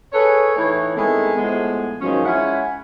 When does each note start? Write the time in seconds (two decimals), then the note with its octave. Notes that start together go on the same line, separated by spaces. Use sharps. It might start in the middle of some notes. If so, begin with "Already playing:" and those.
0.13 G#4 A4 B4 C#5
0.56 A2 E3 D#4 C#5
0.95 D#3 G#3 A3 B3 C4 E4
1.37 A2 F3 G#3 B3
2.01 G#2 D#3 F3 F#3 C#4
2.25 G#3 C#4 E4 F4 F#5